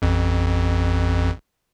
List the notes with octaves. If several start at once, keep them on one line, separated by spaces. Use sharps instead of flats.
A1 F2